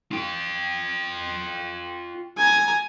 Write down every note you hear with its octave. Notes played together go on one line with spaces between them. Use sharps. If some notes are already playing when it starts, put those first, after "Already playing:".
F4 G5
G#5 A#5